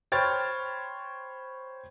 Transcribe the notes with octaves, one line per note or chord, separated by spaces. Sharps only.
C5 C#5 G5 B5 F6 A6